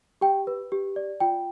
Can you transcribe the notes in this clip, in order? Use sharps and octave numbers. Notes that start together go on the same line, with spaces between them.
G4 G5
B4
G4
D5
F4 G5